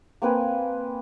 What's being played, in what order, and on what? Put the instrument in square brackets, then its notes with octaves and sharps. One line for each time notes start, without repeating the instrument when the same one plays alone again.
[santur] A#3 C4 B4 G#5